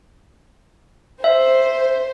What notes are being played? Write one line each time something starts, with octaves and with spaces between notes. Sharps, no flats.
C5 E5